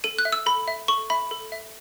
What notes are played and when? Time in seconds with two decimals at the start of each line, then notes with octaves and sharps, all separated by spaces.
0.04 A4 D#7
0.19 F#6
0.25 E5
0.32 E6
0.46 A4 B5
0.68 E5
0.88 A4 C#6
1.10 E5 B5
1.31 A4
1.52 E5